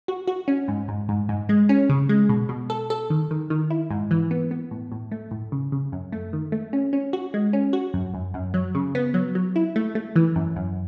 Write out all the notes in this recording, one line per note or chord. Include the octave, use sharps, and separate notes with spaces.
F#4
F#4
C#4
G#2
G#2
G#2
G#2
G#3
C#4
C#3
G#3
B2
B2
A4
A4
D#3
D#3
D#3
E4
G#2
E3
B3
B3
A2
A2
A3
A2
C#3
C#3
F#2
A3
D#3
A3
C#4
C#4
F#4
G#3
C#4
F#4
F#2
F#2
F#2
F#3
C#3
B3
F#3
F#3
E4
A3
A3
E3
F#2
F#2